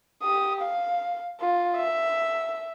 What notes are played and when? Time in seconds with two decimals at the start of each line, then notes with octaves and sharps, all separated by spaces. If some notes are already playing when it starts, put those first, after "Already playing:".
0.23 G4 D#6
0.61 F5
1.40 F4
1.77 E5